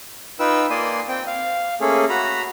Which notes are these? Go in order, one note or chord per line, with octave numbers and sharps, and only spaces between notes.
D#4 F4 B4 G5 E6
A#3 D5 G#5 C6 D#6
C4 G5
F5
A3 A#3 C#4 G#4 A4
F#4 A#5 B5